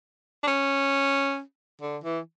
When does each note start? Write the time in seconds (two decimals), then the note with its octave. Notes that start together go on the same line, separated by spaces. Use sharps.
0.43 D4
0.47 C#4
1.82 D3
2.04 E3